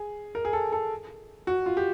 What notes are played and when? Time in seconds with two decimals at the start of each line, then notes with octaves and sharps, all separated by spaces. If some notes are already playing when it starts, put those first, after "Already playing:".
Already playing: G#4
0.35 A#4
0.45 G#4
0.53 A4
0.72 A4
1.47 F#4
1.66 F4
1.77 G4